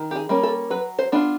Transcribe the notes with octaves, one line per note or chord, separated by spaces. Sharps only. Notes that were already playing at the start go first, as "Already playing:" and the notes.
Already playing: D#3
G4
G#4
G3 A#3 C#4
A4
F#3 B4
C5
B3 D4 F4